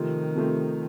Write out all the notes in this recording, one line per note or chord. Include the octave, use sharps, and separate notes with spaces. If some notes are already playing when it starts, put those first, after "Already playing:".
Already playing: C3 D#3 F3 A3 C4
C3 F3 A3 C4